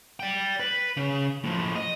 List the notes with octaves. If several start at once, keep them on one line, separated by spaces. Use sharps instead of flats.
D5 G5
B4
C#3
A2 F3
D#5